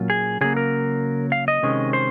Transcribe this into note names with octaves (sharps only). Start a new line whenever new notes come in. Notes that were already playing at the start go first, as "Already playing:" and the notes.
Already playing: A#2 F#3 C#4 F4
G#4
C#3 F#3 A#3 G#4
A#4
F5
D#5
C3 D#3 G#3 C#4
C5